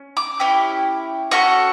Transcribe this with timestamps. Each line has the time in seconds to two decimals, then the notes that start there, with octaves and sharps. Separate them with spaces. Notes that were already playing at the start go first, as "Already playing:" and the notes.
Already playing: C#4
0.17 D6
0.40 C#4 E4 G4
1.31 C#4 F#4 A4 C#6